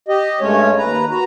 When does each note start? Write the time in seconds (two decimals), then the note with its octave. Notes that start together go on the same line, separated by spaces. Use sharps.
0.08 G4 D#5
0.41 G2 G#3 A3 C#4 C#5
0.77 D#2 B4 A#5
1.10 F#4 A#5